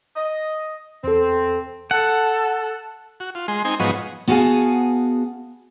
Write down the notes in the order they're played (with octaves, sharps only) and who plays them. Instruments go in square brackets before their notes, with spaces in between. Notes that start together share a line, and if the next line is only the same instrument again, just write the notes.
[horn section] D#5
[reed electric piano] E2 A4 [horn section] C4
[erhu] A4 [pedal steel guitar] F#5
[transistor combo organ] F#4
F4
G#3 C6
C4 D#4 G#5
G#2 F3 F#3 B3 D#5 C#6
[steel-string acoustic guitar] B3 F#4 G#4 F5 G#5 A5